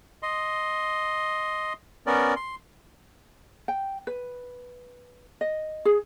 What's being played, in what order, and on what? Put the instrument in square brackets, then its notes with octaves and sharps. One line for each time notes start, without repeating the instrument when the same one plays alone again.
[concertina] D#5 C6
B3 C#4 A#4 D5
C6
[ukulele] G5
B4
D#5
G#4